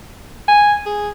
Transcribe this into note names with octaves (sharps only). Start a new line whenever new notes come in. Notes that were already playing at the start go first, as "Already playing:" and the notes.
G#5
G#4